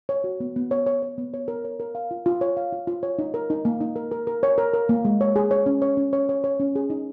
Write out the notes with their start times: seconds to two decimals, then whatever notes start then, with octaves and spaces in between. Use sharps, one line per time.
0.09 C#5
0.24 F#4
0.40 B3
0.56 B3
0.71 C#5
0.86 C#5
1.02 C#5
1.18 B3
1.34 C#5
1.48 A#4
1.65 C#5
1.80 A#4
1.95 F5
2.11 F4
2.26 F4
2.41 C#5
2.57 F5
2.73 F4
2.87 F4
3.03 C#5
3.19 D#4
3.34 A#4
3.50 D#4
3.65 A#3
3.81 D#4
3.96 A#4
4.11 A#4
4.27 A#4
4.43 C#5
4.58 A#4
4.74 A#4
4.89 A#3
5.05 G#3
5.21 C#5
5.36 G#4
5.51 C#5
5.66 C#4
5.82 C#5
5.97 C#4
6.13 C#5
6.29 C#5
6.44 C#5
6.60 C#4
6.76 G#4
6.90 D#4